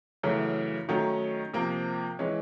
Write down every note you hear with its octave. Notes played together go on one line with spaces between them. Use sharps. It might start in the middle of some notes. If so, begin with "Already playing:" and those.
F#2 C#3 E3 A3
D#3 F#3 A3 C#4
C3 F3 A#3
E3 G#3 C#4